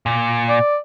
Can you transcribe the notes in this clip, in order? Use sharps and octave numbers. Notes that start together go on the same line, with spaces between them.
A#2
D5